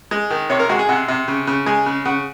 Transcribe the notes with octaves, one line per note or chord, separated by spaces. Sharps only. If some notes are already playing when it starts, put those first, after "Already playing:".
G#3
D#3
C3 C#5
A#4
G#3 F#4
G#4
C3 F#5
C3
C#3
C#3
G#3 G#5
C#3
C#3 F#5